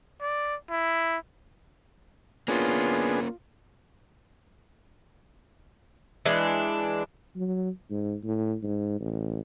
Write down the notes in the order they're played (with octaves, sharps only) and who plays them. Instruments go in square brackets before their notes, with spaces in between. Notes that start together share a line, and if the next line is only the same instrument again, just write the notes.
[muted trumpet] D5
E4
[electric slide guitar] A#3 C#4 [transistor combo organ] B3 D4 G#4 [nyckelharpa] F4
[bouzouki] E3 G#3 D4
[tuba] F#3
G#2
A2
G#2
A1